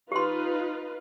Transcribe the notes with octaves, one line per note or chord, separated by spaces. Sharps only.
D#4 F4 G4 B4 C6